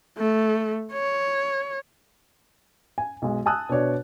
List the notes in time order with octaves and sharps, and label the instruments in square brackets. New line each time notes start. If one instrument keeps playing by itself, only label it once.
[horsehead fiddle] A3
C#5
[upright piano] G#5
B1 G#3
G#5 A5 D#6 E6 F#6
B2 D4 C#5 D5